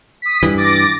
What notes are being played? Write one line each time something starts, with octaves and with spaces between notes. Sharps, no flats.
D#6 B6
G2 E3
D6 A6 A#6